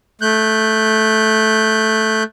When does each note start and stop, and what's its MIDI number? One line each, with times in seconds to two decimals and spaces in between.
0.21 2.23 57
0.21 2.23 90
0.21 2.23 91